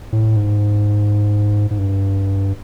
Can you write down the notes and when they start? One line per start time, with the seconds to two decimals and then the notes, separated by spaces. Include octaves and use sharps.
0.12 A2
0.36 G#2
1.71 G#2
1.79 G2